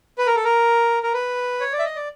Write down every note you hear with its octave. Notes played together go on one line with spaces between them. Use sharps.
B4
A#4
A4
A#4
A#4
B4
C#5
D5
E5
D#5
D5